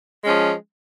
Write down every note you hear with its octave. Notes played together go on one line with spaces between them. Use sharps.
F3 G#3 C#4